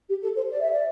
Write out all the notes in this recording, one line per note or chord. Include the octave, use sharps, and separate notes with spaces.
G4
A4
C5
D5
E5
D5